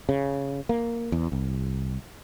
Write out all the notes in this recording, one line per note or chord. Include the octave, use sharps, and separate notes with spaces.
C#3
A#3
E2
C2